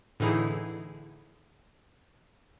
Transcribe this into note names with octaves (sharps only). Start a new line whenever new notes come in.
A2 D3 E3 D#4 E4 G#4